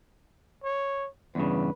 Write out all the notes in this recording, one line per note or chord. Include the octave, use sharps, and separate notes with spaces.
C#5
E2 G2 C#3 B4